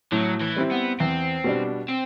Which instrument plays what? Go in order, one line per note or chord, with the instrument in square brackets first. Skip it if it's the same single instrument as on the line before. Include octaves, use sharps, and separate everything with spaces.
[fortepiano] A2 [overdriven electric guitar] F#3
[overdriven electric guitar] E3
[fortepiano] G3 C4 E4
[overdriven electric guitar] B3
[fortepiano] E2 [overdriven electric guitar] C4
[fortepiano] B2 G3 D4
[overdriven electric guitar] C4